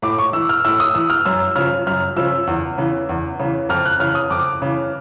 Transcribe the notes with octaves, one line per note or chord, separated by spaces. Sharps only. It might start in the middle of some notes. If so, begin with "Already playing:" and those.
A2 D6
C#6
E3 E6
F6
A2 E6
D#6
E3 E6
F6
F#2 E6
C#3 F3 F6
F#2 F6
C#3 F3 E6
E2
C#3 E3
E2
C#3 E3
F2 F6
F#6
C#3 E3 F6
D#6
F2 D6
C#3 E3